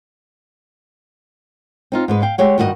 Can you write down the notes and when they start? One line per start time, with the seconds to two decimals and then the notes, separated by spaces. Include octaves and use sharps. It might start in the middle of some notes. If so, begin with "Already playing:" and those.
1.92 C4 D#4 F4
2.08 G#2 G#3 B4
2.22 F5 G5
2.38 G#3 G4 C#5 F#5
2.58 G2 D#3 F#4 A4 D#5